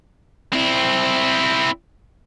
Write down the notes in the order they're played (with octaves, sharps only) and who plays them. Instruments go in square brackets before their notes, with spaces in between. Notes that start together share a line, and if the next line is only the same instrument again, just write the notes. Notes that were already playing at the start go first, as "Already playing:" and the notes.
[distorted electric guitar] C4 E4